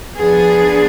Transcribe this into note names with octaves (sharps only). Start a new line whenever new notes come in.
F3 B3 D4 G#4